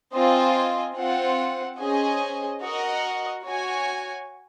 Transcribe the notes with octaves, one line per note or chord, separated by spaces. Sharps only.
C4 F4 C5 D#5 G#5
C4 F4 C5 F#5
C#4 G#4 C5 D#5 G#5
F#4 A#4 D#5 F#5
F#4 C#5 G#5